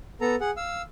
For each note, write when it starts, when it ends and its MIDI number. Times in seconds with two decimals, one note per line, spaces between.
0.21 0.35 59
0.21 0.35 69
0.21 0.35 82
0.40 0.51 68
0.40 0.51 78
0.57 0.82 77
0.57 0.82 88